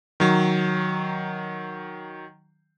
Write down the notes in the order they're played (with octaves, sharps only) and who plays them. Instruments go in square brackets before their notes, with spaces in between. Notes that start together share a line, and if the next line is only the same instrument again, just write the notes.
[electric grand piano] D#3 F#3